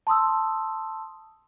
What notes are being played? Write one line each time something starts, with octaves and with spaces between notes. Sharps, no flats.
A5 C6 D#6 E6